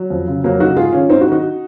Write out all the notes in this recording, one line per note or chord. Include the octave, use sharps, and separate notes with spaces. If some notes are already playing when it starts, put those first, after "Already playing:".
Already playing: F#3
F2
C#3
F2 F#3 A#3
C#3 D#4 F#4
G#2 F4 G#4
D#3 C#4 F4
G#2 C4 D#4
D#4 F#4
D#3
D#4 F#4